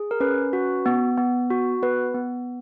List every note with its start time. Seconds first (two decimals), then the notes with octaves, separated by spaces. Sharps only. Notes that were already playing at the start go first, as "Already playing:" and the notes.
Already playing: G#4
0.11 A#4
0.20 C#4 B4
0.53 F#4
0.86 B3
1.18 B3
1.50 F#4
1.82 B3 B4
2.14 B3